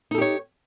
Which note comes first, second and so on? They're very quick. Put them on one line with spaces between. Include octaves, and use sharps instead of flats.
D#4 A4 G4 C#5